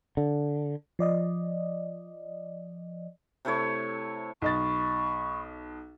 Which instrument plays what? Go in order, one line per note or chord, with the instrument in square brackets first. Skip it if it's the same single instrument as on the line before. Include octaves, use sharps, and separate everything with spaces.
[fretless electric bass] D3
[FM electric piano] F3 D5 D#5
[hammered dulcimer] C3 A3 E4 C#5
[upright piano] B1 D#5 A6 [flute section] B5 C#6